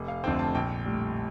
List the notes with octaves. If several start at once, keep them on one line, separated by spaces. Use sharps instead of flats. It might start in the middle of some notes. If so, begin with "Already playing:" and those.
Already playing: F1
F5
F2 D3 A3 C4 G5
A5
A#1 G5
A2 G3